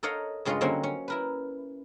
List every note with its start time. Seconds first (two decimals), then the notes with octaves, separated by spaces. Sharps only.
0.03 A4 A#4 C#5 D#5 F5 F#5
0.45 G2 C#3 G#3 F4 C#5 D#5
0.61 D3 F#3 G3 A#3 C4 C#4
0.83 C#4
1.08 E4 A#4 B4